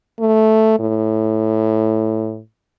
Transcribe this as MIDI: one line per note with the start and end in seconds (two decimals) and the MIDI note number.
0.20 0.79 57
0.80 2.39 45